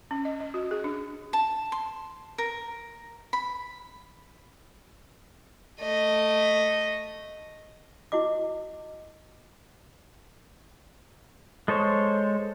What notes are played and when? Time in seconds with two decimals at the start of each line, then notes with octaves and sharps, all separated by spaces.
0.11 C#4
0.25 D#5
0.40 D#5
0.54 F#4
0.71 G#4
0.84 D4
1.33 A5
1.72 C6
2.38 A#4
3.33 B5
5.81 A3 D#5
8.12 E4 F#4 D#5 D6
11.68 G#3 A4 C5 C#5